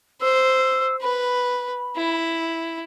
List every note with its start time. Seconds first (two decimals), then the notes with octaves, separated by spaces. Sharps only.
0.21 C5 E6
1.02 B4 B5
1.96 E4